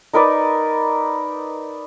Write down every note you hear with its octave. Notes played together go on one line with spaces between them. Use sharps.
D#4 A#4 B4 D5